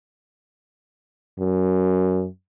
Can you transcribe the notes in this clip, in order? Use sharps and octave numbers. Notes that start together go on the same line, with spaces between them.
F#2